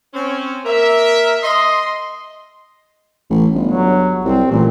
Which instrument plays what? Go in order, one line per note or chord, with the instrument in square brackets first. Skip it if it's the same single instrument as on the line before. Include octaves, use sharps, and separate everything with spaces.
[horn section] C4 C#4
A#3 A#4 E5
D#5 C6
[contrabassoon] A1
G1
[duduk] F#3
[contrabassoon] C2 [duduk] C4
[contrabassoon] A1 [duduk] A#2